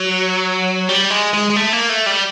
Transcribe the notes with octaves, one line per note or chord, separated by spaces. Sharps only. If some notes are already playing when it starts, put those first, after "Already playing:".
Already playing: F#3
G3
G#3
G#3
G#3
A3
A#3
A3
G3